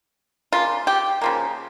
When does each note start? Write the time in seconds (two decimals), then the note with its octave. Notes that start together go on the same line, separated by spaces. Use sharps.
0.53 C#3 F3 A#3 F4
0.87 G4
1.21 C#3 F3 A#3